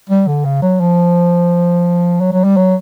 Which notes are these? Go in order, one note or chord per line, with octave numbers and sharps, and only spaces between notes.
G3
D3
C#3
F#3
F3
F#3
F#3
G3
F#3